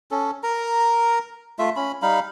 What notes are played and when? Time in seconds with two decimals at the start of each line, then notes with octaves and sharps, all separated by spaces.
0.11 C#4 A4
0.43 A#4 A#5
1.59 A3 F4 E5
1.76 C#4 B5
2.02 G3 D#4 F5 B5